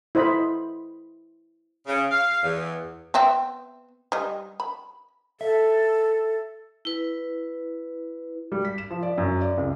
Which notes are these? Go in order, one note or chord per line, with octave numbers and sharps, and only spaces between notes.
E4 C5 D#5 B5
C#3
F5
E2
B3 C4 E5
G3 D#5
B5
A4 E5
E4 B4
G3
B6
E7
F3
D5
F#2
D5
C#2